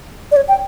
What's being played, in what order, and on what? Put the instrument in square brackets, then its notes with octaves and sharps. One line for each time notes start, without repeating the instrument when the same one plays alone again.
[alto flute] D5
C#5
G5